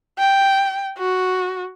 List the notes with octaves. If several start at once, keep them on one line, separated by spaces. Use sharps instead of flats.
G5
F#4